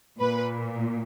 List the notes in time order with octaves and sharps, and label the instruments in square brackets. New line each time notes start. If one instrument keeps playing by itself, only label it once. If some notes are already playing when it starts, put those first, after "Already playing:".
[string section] A#2 B4